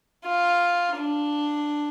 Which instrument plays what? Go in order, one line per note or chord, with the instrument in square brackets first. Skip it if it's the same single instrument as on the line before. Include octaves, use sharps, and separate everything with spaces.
[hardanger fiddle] F4
D4